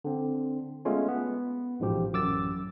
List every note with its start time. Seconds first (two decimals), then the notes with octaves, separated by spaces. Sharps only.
0.04 D3 C4
0.85 G#3 A3 B3 C#4 F4
1.08 B3
1.80 A1 G#2 B2 F3 G4
2.13 A1 F#2 D6 E6 A6